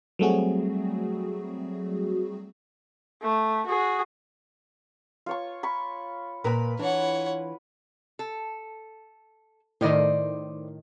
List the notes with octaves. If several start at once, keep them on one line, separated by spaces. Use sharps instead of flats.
F#3 G3 A3 C4 F#4 G#4
A3
F#4 G#4
F4 C#5 C#6
B5 C#6
A#2 A#4 B4 B5
E3 D4 C#5 F#5
A4
A2 D#3 C5 D5 D#5